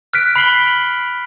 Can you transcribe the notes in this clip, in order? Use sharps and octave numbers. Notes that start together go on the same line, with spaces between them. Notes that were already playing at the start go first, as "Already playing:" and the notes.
F6 F#6 B6 D7
B5 C7 F#7 G7